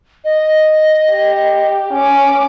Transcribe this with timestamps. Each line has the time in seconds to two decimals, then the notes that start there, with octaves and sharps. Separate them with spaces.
0.25 D#5
1.10 G4
1.93 C#4 D6